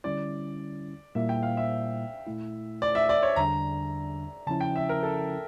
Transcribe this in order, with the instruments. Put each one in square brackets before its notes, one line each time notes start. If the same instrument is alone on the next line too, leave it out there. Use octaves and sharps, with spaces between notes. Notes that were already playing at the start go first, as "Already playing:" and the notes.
[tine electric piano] D3 G3 C#4 E4 [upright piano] D5
[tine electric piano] A#2 G3 A#3 E4 [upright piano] E5
[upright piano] G5
F5
E5
[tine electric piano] A#2 A3 E4
[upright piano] D5
E5
D5
C#5
[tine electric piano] E2 D3 G3 D4 [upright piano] A#5
[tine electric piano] C#3 F3 C#4 E4 [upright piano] A5
[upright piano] G5
E5
A#4
A4